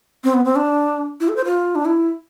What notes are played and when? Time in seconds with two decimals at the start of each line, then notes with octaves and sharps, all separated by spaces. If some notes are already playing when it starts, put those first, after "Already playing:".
0.24 C4
0.34 B3
0.45 C4
0.56 D4
1.20 E4
1.28 A4
1.36 C5
1.45 F4
1.75 D4
1.85 E4